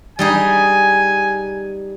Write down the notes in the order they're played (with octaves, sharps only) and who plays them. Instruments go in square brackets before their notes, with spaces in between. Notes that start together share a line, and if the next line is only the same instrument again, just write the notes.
[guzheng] G3 D#4 G#4 [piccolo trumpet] G#5